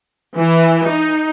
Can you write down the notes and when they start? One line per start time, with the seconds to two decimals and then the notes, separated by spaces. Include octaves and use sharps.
0.37 E3
0.86 D#4